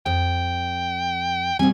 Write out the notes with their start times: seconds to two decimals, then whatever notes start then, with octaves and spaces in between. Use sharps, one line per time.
0.06 F2 G5
1.59 B2 G3 C4 G#5